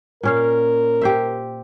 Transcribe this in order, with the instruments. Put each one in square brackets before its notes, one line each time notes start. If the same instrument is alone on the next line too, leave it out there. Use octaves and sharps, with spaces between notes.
[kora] A#2 C#4 F5 [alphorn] A#4
[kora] G4 C5 E5